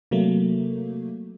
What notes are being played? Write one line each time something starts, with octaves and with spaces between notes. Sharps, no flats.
C3 F#3 A3 A#3